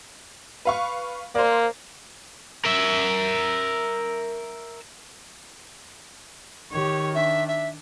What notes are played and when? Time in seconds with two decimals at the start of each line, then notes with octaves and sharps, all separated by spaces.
0.65 B4 F5 C#6
1.35 A#3 C5 D5
2.64 A#4 E5
6.72 D#3 G4 C#5
7.15 D4 E5
7.48 E5